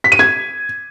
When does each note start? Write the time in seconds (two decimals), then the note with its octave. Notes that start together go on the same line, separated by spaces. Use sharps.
0.04 B6
0.12 D#7
0.19 G#6